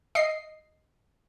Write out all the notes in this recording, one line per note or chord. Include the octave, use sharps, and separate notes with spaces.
D#5 C7